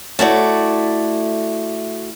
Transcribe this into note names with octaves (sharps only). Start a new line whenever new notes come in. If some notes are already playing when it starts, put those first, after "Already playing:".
A3 E4 F#4 D5